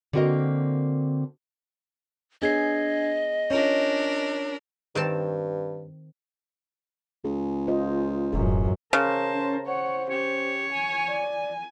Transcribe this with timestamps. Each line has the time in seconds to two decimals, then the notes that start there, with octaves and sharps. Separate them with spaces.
0.13 D3 A#3 C4 F#4 A#4 D#5
2.42 B3 D4 G#4 C#5 D#5 G#6 C7
3.50 C#4 D4 F4 A#4 C#5
4.95 G2 D#3 C4 A5
7.25 C#2 G#4
7.68 F4 C5 D#5
8.33 E1 A1 F#2 G#4
8.93 C#3 A#4 C5 A5
9.34 C#4
9.66 C5 C#5 F#5
10.10 C#4 G4 C#5
10.72 G#5
11.08 D5